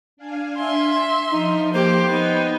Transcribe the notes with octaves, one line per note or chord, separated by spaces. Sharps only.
D4 F5 G#5
E5 C6
F3 D#4
A#3 G4 C5
B3 D#4 G5